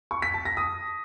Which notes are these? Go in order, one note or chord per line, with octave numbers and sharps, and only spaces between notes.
C#6
B6
A5
A#6
D#6